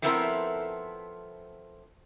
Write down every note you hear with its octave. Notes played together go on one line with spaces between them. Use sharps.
F3 A3 B3 C4 E4 A#4